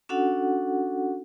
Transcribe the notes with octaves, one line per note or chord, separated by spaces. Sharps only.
C#4 D4 F#4 A4 F#5